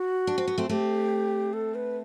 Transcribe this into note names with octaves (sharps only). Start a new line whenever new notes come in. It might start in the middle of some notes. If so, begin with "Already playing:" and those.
Already playing: F#4
D4
C4
B3
A3 C4
A3 C4 G4
A4
B4